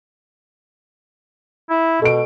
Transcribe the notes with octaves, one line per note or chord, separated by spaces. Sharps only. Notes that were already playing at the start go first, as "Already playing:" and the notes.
E4
B2 A4 D7